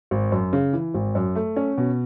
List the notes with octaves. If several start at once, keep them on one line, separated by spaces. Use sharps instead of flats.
G#1
F#2
C#3
E3
G#1
F#2
A3
C#4
B2